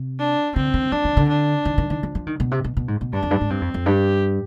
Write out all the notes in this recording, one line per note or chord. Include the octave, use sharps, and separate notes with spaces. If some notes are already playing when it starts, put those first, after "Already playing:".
Already playing: C3
D4
D3 C4
D#3
F3 D4
D#3
D3
D4
D#3
D#3
D#3
F3
F3
D#3
B2
C3
B2
B2
G#2
B2
G2 D4
F2
G2
G#2
G2 C4
F2
F2
G2 G4